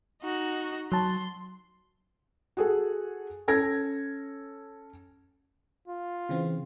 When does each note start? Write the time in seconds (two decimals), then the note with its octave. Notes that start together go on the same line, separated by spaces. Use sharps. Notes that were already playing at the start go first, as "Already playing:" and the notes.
0.22 D#4 F#4
0.92 F#3 A5 C6
2.57 F#4 G#4 A4
3.48 C#4 A4 G#6 A#6
5.88 F4
6.29 C#3 E3 C4